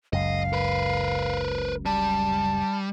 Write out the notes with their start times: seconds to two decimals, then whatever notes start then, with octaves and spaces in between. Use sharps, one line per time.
0.13 F#1 C#2 F#2 D#5 F5
0.53 A#4 B4
1.86 G3 A5